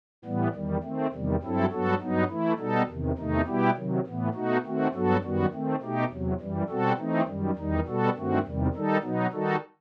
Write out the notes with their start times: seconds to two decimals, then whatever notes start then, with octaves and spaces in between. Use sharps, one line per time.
0.25 A2 E3 G3 B3
0.54 E2 D#3 G3
0.83 D#3 A3 C4
1.12 E2 C3 D#3 G3
1.42 G2 F#3 C4 E4 A4
1.71 G2 F#3 B3 F#4 A4
2.01 G2 F#3 B3 D#4
2.29 E3 A3 E4
2.58 B2 G3 B3 D#4 A4
2.89 E2 C3 D#3
3.18 E2 C3 D#3 A3 D#4
3.47 B2 G3 B3 E4 G4
3.76 C3 D#3 F#3
4.06 A2 E3 B3
4.34 B2 A3 D#4 F#4
4.63 D#3 A3 C4 F#4
4.93 G2 F#3 B3 F#4 A4
5.22 F#2 D#3 G3 B3 F#4
5.51 D#3 A3 C4
5.81 B2 A3 D#4 G4
6.11 E2 C3 F#3
6.40 F#2 E3 G3
6.69 B2 G3 C4 F#4 A4
6.98 E3 A3 C4 D#4
7.27 F#2 D#3 G3
7.56 E2 D#3 G3 D#4
7.86 B2 G3 B3 F#4 A4
8.15 G2 D#3 A3 C4 F#4
8.44 E2 C3 D#3 G3
8.74 D#3 G3 D#4 A4
9.03 B2 F#3 B3 D#4
9.32 D#3 G3 D#4 F#4 A4